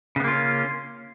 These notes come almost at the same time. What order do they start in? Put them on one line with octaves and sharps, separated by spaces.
C#3 B3 A#3 F4 C#4